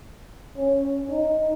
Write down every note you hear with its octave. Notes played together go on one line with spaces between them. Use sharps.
C#4
D#4